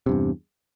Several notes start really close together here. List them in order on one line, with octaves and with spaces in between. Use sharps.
C3 G2 E2